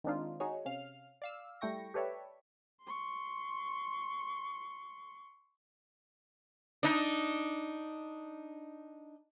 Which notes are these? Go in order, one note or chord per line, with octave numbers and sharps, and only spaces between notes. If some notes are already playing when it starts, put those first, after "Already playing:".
D#3 G#3 C4 D4 D#4 F4
D#4 F#4 G#4 C#5
C3 C#4 F5 F6
D5 F5 E6
G3 A3 E4 G5 C#6 A#6
G4 A4 B4 C#5 D5 E5
C6 C#6
D4 D#4